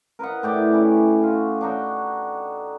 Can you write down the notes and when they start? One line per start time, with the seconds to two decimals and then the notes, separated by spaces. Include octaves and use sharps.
0.19 A#4 B4 D#5 F#5
0.43 A2 G4 D5 G5
0.71 C#4 E4
1.23 F4 F#4
1.61 D4 D#4 F#4 G5